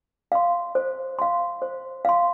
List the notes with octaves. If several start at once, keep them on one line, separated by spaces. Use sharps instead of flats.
F5 C6
C5
F5 C6
C5
F5 C6